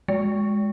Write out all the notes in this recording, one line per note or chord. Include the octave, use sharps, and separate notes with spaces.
G#3